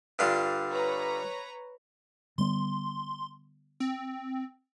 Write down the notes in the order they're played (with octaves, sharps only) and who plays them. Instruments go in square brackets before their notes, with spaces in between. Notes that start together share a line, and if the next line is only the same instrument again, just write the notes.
[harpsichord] G2 D3 F4
[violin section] B4 C#5 A#5
[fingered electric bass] D3 G3 B3 [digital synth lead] C6
[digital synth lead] C4